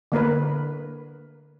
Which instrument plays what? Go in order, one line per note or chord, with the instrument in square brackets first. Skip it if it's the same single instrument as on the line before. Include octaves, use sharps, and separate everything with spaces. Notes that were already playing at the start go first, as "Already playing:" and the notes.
[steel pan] D3 A#3 A#4 B4